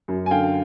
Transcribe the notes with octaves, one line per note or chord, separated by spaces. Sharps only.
F#2
G#5
D3 F5 G5